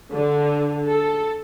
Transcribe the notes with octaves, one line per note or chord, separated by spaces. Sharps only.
D3
A4